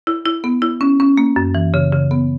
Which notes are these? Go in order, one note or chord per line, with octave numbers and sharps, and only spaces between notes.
E4
E4
B3
E4
C#4
C#4
A#3
F#2
E3
C#3
C#3
B3